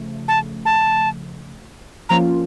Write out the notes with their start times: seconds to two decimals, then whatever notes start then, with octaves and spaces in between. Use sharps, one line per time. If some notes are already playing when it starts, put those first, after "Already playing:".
Already playing: C#3 F3 A3
0.28 A5
0.65 A5
2.09 F3 A#3 C#4 F4 A#5